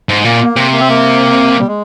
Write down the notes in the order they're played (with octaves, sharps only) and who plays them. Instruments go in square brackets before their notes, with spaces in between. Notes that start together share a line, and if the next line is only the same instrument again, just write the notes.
[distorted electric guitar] G#2
[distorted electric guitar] A#2 [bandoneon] A#3
[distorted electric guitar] C3
[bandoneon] A#3
C4
A#3
G3
G#3